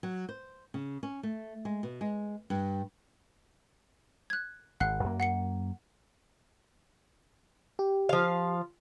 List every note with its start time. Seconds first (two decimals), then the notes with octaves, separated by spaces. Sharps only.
0.03 F#3
0.29 C5
0.74 C#3
1.03 C#4
1.23 A3
1.65 G#3
1.83 B2
2.01 G#3
2.50 G2
4.30 F#6 G#6
4.80 G#1 F#5 F#6 C7
5.04 F#2 A#3
5.20 F#5 C7 C#7
7.79 G4
8.09 F3 F5